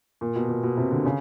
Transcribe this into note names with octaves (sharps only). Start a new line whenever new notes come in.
A#2
B2
A#2
B2
C3
D3
C#3